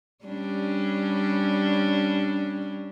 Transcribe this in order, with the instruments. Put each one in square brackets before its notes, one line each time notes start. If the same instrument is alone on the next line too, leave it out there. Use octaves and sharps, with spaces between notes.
[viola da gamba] G3 C#4 D4